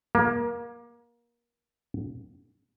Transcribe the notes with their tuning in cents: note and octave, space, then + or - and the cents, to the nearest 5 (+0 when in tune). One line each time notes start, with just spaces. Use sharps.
A#3 +25